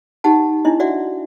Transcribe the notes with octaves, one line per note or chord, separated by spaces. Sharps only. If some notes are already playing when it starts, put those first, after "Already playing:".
D#4 G4 F#5 A5
D4 E4 D#5
F#4 D5 E5 F#5